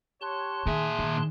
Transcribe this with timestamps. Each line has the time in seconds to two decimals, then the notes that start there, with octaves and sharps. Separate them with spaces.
0.21 G4 C#5 A5 C6 F#6
0.66 A#2 D#3 G#4 E5
0.99 D#3